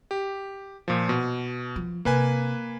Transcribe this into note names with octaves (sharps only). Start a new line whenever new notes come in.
G4
A#2 F3
B2
F3
C3 A#3 B4 G#5